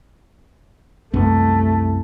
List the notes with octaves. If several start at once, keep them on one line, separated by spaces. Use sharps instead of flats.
C2 F#2 A3 B3